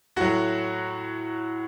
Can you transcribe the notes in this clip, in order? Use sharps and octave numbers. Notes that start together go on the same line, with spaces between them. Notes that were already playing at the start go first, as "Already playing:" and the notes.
A2 F#3 F#4